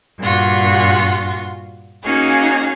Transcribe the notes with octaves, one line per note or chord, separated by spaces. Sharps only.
G2 A#2 F4 F#4
A#3 C#4 D#4 F#4 G#4 F5